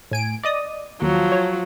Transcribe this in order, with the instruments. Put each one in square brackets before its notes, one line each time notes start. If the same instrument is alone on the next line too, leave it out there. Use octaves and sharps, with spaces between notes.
[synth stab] A2 G#5 D7
D5 D#5 D#6
[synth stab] D#2 [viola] F3 F#3
[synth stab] C#5